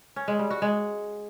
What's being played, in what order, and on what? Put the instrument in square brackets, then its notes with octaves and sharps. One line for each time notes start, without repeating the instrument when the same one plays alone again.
[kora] C#4
G#3
G3
F#4
G#3